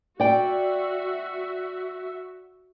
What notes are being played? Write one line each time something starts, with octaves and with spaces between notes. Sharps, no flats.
F#4 D5 E5 G5